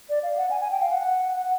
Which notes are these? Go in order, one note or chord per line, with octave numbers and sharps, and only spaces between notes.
D5
F5
F#5
G#5
G#5
G5
F5
F#5